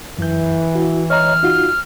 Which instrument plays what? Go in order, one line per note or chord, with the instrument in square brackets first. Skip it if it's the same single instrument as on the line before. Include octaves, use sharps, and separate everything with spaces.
[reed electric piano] F#2 G6 [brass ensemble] E3
[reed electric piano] E4 F#4
[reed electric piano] C#5 D#5 A#5 [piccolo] F6
[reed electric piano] D#4 F4 F#4